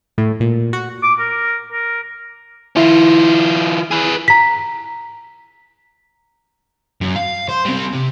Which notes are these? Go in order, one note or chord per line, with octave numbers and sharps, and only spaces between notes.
A2
A#2
F#4
D6
A#4
A#4
E3 E4 F4
G#4 B4
A#5 B6
F#2
F5
C5
G3 C4
C3